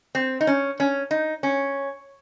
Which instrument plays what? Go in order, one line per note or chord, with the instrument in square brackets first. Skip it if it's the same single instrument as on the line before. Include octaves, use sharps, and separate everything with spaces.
[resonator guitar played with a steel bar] C4
D#4
C#4
C#4
D#4
C#4